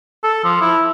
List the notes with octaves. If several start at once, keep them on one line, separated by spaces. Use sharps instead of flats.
A4
F3
E4